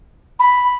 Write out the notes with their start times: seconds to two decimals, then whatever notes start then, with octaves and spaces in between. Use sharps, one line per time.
0.39 B5